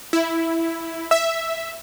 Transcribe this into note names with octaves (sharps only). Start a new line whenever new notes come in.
E4
E5